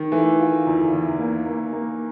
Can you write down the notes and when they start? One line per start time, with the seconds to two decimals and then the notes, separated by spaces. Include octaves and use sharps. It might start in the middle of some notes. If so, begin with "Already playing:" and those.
Already playing: D#3
0.12 E3 A3
0.40 F4
0.67 E2
0.92 E2
1.19 A#3
1.46 A#3
1.73 A#3